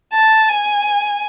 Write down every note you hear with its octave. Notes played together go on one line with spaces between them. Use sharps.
A5
G#5